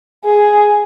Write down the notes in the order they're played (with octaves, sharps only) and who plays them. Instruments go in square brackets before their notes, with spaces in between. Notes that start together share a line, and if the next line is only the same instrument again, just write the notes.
[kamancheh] G#4